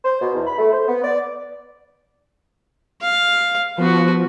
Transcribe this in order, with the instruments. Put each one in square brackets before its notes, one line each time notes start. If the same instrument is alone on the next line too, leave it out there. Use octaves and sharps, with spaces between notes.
[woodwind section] C5
B2
E2
B5
A3
C5
B3
D5
[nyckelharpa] F5
[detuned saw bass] F3 [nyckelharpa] B3 F#4